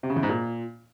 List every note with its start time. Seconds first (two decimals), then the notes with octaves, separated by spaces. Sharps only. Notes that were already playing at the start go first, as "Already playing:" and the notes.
0.03 C3
0.10 C#3
0.16 E2
0.23 G#2
0.29 A#2